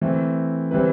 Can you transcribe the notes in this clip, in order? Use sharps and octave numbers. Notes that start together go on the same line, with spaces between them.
E3 A3 C4
E3 G3 C4 E4 B4